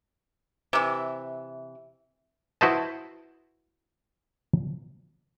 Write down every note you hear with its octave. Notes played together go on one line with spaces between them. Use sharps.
C3 E3
E4 F#4 B4 C5 D#5 A5